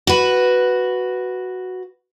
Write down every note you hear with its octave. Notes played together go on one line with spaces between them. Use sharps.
F#4 B4